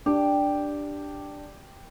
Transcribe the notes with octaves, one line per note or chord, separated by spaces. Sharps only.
D4 G4